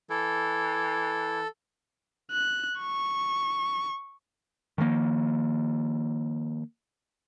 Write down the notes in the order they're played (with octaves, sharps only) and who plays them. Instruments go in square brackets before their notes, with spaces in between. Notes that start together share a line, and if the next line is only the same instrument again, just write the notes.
[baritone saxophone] E3 [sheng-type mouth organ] A4
[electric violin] F#6
C#6
[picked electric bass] D#3 F3 G3 A#3